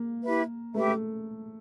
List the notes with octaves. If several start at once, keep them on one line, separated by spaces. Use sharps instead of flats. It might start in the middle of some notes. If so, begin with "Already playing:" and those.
Already playing: A#3
E4 G4 B4 E5
A3 G4 B4 E5
A3